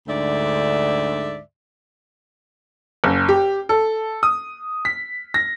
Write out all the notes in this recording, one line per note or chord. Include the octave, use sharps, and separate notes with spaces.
D2 G#2 D3 D5 E5
F#1
G4
A4
D#6
B6
A#6